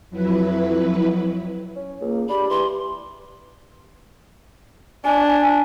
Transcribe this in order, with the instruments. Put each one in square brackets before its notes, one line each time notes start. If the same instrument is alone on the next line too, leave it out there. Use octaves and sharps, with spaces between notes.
[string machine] F2 F#3 E4 B4
[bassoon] C#4
[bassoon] C#2 [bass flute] A#3
[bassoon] D4 [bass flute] G4 [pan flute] B5
[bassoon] E3 [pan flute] C6
[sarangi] D4 [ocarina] G#5